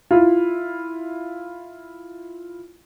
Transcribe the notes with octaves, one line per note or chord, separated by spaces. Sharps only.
E4 F4